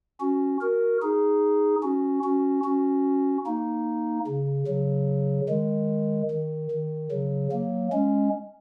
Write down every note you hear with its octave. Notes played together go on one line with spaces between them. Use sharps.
C#4 F#4
F#4 A#4
D#4 G#4
C#4 F#4
C#4 F#4
C#4 F#4
A#3 D#4
C#3
C#3 F#3
D#3 G#3
D#3
D#3
C#3 F#3
F#3 A#3
G#3 C#4